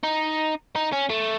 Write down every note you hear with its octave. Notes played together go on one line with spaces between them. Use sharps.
D#4
D#4
C#4
A3